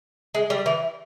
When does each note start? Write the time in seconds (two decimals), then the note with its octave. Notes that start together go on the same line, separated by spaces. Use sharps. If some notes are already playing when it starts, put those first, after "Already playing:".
0.35 G#3
0.50 G3
0.66 E3